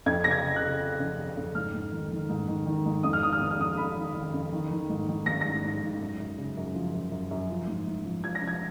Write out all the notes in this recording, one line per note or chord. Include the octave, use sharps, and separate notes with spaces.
F2 G#6
C#3 A#6
G#6
C#3
F#6
C#3
C#3
F2
C#3
F2
G#2 F6
G#2
D#3
D#3
G#2
D#3
D#3
G#2
F2 D#6
F6
D#3 D#6
F6
F2 D#6
F6
F2 D#6
F2 B5
D#3
D#3
F2
D#3
D#3
G#2
D#3
G#2 A#6
G#2 A#6
G#2
G#2
F#2
F#2
C#3
F#2
F3
F#2
F#2
F#2
F3
G#2
G#2
F3
F3 G#6
A#6
F3
G#6